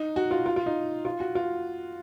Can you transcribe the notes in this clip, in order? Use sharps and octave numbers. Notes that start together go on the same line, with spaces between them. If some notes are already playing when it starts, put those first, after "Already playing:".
Already playing: D#4
F#4
F4
F4
F4
D#4
F4
F#4
F4